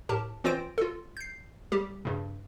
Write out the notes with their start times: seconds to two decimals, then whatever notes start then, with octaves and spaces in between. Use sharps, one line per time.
0.09 A2 G4 A#4 A5
0.44 E3 C4 F4 C5 A#6 D7
0.78 F4 A4
1.17 G6 C7
1.72 G3 G4
2.05 G2 C#3